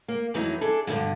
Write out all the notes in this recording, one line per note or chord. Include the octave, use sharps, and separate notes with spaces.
A#3
F2 E3 F#3 D#4 E4
D4 G#4 A4
G2 B2 D3 E3 F#3